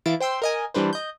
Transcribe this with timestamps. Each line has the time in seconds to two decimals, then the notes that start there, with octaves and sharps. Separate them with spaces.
0.06 E3 E4 F5 A6 D7
0.20 C5 G5 C6 E6
0.42 A#4 D#5 G#5
0.74 E3 G3 D4 B4 C5
0.93 D#5 G6